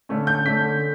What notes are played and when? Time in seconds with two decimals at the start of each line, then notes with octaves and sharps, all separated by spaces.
0.09 D3 A3 C#4
0.27 G6
0.45 D3 A3 C#4 B6